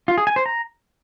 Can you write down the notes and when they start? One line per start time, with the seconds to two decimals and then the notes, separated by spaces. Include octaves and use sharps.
0.08 F4
0.18 G#4
0.27 G#5
0.36 C5
0.46 A#5